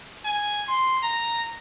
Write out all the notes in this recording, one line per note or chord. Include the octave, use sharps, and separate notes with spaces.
G#5
C6
A#5